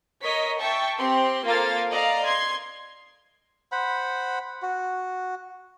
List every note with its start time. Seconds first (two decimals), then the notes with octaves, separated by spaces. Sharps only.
0.23 A#4 C#5 D#5 B6
0.59 E5 G5 A5 C#6
0.98 C4 G4 C6
1.44 A#3 F4 A4 C5 F5 A6
1.91 D5 D#5 F5 A#5
2.25 C6 G#6
3.72 C5 F#5 B5
4.62 F#4